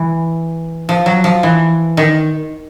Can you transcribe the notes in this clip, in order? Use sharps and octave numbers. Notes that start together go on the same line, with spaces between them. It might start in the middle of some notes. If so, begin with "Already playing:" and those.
Already playing: E3
F3
F#3
F3
E3
D#3